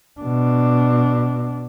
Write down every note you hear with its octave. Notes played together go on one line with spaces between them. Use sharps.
B2 D4